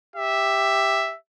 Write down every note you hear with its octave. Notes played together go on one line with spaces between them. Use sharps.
G4 E5